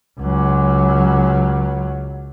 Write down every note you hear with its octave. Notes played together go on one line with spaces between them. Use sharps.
C#2 F#3